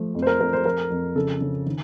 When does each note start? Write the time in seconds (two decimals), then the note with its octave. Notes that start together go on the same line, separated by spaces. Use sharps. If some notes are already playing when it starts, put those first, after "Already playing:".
Already playing: F3 A3
0.15 F2
0.22 C5
0.27 A#4
0.40 F2 A#4
0.53 C5
0.65 F3 A#4
0.90 F2
1.15 C#3 A4
1.41 C#3
1.66 D#3